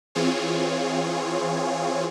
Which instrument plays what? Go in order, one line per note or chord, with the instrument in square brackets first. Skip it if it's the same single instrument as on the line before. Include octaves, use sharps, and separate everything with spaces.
[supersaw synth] E3 C4 F4 G#4 C#5